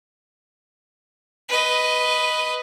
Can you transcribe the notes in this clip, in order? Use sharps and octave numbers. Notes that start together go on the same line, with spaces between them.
B4 D#5